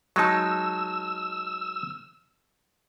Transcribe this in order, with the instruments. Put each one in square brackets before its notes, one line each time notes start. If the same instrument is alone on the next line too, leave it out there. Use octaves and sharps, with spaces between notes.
[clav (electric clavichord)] F#3 G#3 D#4 [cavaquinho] A5 C#6 [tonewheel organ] E6